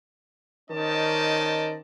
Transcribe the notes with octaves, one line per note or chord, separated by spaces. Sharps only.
D#3 C#4 C5 D5 D#5 A5